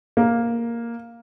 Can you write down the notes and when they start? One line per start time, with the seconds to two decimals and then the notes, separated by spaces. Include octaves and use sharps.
0.17 A#3